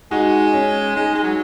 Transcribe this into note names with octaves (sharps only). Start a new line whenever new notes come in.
G#3 D#4 F#4
C#4
G#3 D#4
G#3
F#3